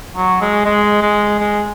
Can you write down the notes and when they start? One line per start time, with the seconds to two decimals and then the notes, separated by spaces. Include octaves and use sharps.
0.16 F#3
0.41 G#3
0.65 G#3
1.02 G#3
1.39 G#3